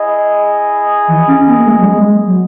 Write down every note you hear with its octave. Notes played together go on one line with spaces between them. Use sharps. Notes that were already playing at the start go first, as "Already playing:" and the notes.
Already playing: E4 G#4 D#5
E3
C#4
B3
A#3
G#3
F#3
G#3
F#3